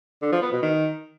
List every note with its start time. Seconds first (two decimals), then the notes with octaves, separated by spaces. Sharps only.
0.22 D3
0.32 F3
0.42 B3
0.52 B2
0.62 D#3